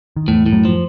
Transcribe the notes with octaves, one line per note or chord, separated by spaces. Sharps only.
D#3
E2 A2 E3
A2
F#2 F#3
F3